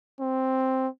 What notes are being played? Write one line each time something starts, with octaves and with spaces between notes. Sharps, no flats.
C4